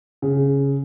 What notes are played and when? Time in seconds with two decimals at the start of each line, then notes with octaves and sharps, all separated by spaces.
0.22 C#3